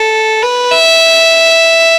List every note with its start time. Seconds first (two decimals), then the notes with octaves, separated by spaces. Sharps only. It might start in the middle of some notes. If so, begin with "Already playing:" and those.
Already playing: A4
0.42 B4
0.71 E5